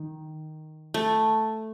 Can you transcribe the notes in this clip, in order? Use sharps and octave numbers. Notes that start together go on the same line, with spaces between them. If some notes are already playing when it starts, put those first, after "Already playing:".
Already playing: D#3
A3